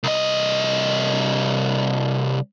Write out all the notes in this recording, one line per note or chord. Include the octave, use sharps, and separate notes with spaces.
C2 D#5